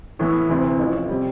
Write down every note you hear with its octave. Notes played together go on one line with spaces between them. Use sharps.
A2 E3 B3 E4
D2 C3 E3
A1 A2 F3
C3 G3